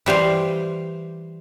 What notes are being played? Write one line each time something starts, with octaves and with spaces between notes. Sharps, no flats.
E3 G3 C5 F5